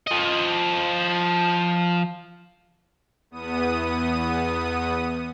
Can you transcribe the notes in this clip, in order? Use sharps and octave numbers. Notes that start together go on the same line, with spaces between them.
F3 D#5
E2 B3 D#6 D#7